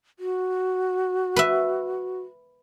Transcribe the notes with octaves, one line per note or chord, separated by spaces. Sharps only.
F#4
B4 E5